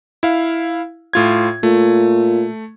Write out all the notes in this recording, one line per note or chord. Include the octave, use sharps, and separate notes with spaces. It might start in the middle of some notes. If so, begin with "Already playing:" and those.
E4 F5
A2 F4 G#6
A#2 A3